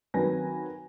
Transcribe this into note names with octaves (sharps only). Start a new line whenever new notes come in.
D#3 F#3 C4 B4 G#5 A#6